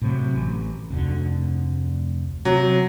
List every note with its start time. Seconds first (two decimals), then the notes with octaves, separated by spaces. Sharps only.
0.02 A2 C3 F#3
0.34 A1
0.90 F1 D2 D3
2.45 C3 F#3